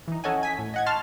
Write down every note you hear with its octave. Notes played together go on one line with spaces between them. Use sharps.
E3 D#4
C#4 A4 C#5 D#5 F#5 G#5
G#5 B6
A2
D#5 F#5 G#6
A5 C6 C#6 F6 A6